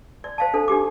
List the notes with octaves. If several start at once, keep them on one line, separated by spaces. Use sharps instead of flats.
D5
C5 F5 A5
D4 A4 C5
D4 D#4 G4 D6